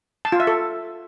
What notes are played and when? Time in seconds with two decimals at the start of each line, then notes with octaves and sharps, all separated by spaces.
0.25 A5
0.32 F4
0.40 E5
0.47 A4